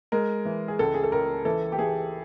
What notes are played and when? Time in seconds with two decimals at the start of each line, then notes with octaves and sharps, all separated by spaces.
0.12 G#3 A#4
0.45 E3
0.68 G#4
0.79 C#2 A4
0.94 G#4
1.04 A4
1.12 C#2 A#4
1.45 E3 A4
1.72 G4
1.79 E3 G#4